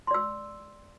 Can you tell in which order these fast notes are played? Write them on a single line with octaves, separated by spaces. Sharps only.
C6 D5 E6